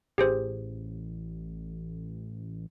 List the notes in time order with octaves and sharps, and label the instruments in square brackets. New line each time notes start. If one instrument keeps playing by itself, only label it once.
[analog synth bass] A1 [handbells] G4 G#4 C5